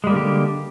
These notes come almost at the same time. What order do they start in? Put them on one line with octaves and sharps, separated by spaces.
G#3 G3 A#3 D3 G4